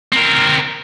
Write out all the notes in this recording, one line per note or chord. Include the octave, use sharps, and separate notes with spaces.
C4 A#4